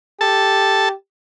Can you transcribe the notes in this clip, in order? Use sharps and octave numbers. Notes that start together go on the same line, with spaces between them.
G4 A4 A5